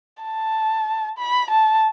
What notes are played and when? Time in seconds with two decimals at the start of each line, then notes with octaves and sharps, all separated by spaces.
0.23 A5
1.18 B5
1.51 A5